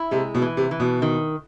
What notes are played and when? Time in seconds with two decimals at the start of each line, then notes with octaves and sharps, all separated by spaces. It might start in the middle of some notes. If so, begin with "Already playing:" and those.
Already playing: E4
0.11 C3 G#3
0.35 B2
0.42 E3
0.57 C3
0.71 E3
0.80 B2
1.02 D#3